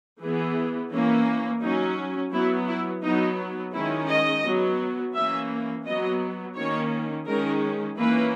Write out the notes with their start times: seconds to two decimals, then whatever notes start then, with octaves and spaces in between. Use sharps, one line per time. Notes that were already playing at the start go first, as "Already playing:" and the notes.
0.21 E3 B3 G#4
0.91 E3 A#3 C#4
1.62 F#3 C#4 D#4
2.32 F#3 B3 E4
2.68 E4
3.03 F#3 B3 D#4
3.74 D#3 G#3 C#4 E4
4.08 D#5
4.44 F#3 B3
5.14 E3 A#3 C#4 E5
5.85 F#3 B3 D#5
6.56 D#3 A#3 C#4 C#5
7.26 D#3 G#3 C#4 A#4
7.97 E3 A#3 C#4 B4